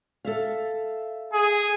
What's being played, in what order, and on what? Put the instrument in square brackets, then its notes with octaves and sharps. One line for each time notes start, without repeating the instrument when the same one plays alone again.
[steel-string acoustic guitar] A4 E5 F5
[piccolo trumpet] G#4